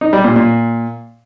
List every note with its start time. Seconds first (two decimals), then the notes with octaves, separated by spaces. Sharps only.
0.01 D#4
0.13 G3
0.24 A#2
0.36 A#2